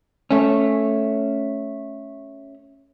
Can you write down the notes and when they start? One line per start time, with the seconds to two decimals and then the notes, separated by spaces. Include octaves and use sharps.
0.31 A3 C#4